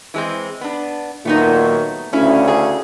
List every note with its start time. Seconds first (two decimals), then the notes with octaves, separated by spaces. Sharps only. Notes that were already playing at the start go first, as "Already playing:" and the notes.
0.14 E3 G#3 C4
0.61 B3 D4
1.25 A#2 D#3 F#3 A3 B3 D#4
2.13 D2 C#3 C#4 E4
2.48 G#4